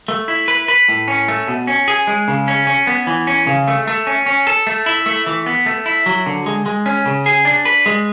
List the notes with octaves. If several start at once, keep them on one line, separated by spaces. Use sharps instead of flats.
A3
E4
B4
B4
A2
C#4
A3
B2
C#4
G#4
G#3
C#3
C#4
C#4
B3
E3
C#4
C#3
A3
A3
C#4
C#4
A4
A3
E4
A3
E3
B3
A3
E4
F#3
D3
G#3
G#3
C#4
C#3
G#4
D4
B4
G#3